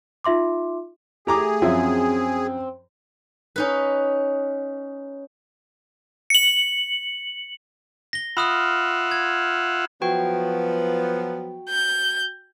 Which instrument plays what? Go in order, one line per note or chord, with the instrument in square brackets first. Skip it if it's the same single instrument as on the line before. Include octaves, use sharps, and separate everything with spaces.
[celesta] D#4 F4 E5 C6 D6
[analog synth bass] A3 [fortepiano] G4 A#5 D6 [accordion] G#4
[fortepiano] F#2 F3 E5 [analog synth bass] C4
[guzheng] C#4 D#4 B4
[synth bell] C#7 F#7
[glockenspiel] A#6 G7
[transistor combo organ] F4 E5 F#5 [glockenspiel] B5 D#6 F6
[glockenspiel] G#6
[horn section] F3 F#3 B3 [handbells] F#4 G5
[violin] G6